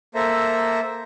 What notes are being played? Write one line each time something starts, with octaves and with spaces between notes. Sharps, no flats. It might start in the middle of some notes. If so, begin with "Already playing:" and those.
A#3 A4 C5 E5 A#5